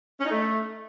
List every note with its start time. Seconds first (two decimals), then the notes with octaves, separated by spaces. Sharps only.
0.20 C#4
0.25 D#4
0.31 A3